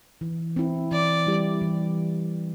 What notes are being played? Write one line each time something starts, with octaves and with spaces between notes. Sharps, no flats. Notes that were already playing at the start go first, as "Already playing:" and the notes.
E3
C4 E4
E3 D5
G3 E4 G4
E3